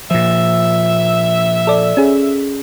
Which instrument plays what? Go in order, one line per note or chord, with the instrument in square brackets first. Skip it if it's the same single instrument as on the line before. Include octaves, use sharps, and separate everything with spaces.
[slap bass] A#2 F3 [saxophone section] E5
[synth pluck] A4 D5
C#4 G#4